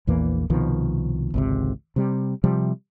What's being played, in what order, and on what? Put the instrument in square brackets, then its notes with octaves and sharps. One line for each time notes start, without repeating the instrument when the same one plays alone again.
[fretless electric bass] A#1 E2 E3 A#3
C2 B2 D#3 F3
G#1 C#2 C3
C3 G3
C3 F3 G3